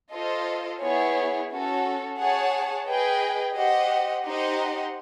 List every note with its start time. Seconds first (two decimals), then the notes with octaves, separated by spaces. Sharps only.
0.12 F4 A4 C5 D#5
0.81 B3 E4 G#4 C#5
1.50 C#4 F#4 A4
2.18 G#4 C#5 F#5 A5
2.87 G#4 B4 D#5 G5
3.55 G4 C5 D#5 F#5
4.24 D#4 G4 C5 D#5 F#5